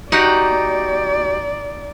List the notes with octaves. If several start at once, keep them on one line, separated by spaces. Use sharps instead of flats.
D#4 F#4 G4 D5 F#5